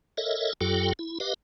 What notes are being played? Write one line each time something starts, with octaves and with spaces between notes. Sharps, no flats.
A4 A#4 C#5 D#5 E5
F#2 F#3 F4 G4 A4 G5
E4
G4 B4 D#5 F5